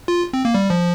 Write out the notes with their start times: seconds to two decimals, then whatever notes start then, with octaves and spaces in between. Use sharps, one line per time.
0.08 F4
0.33 C4
0.45 A#3
0.54 G3
0.70 F3